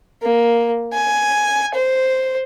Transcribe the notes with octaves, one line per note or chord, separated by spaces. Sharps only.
A#3
G#5
C5